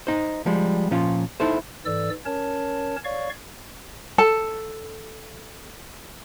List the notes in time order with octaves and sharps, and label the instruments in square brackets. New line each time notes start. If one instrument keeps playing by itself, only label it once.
[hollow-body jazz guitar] D#4 C5
F3 G3 G#3
A#2 F3 C#4 F4
D#4 E4 A4 C5
[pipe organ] G#2 E3 A4 D5 E6
C#4 A#4 C#5 A5
C#5 D5 F5 C#6
[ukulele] A4 A5